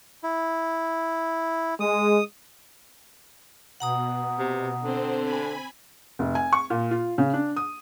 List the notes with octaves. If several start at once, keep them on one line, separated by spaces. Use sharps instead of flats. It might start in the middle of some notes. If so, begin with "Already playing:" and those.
E4
G#3 D#6
B2 F#5 A#5 D#6
C3
D3 C4 C5
G#5 B5
F1
G#5
C#6
A#2
F4
C#3
D4
D#6